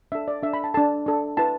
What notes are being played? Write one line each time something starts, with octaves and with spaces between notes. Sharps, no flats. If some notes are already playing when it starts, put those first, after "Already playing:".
D4 A4 E5
D5
D4 A4 E5
B5
A5
D4 A4 A5
D4 A4
E4 B4 A5